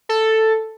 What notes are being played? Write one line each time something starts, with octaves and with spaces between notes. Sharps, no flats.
A4